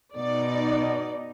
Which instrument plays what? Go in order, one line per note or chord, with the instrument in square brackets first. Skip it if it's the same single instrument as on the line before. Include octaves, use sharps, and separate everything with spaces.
[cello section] B2 D#4 [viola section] D5